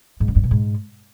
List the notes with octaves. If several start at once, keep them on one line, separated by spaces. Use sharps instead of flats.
G#2
C#3
G2
B2
G#2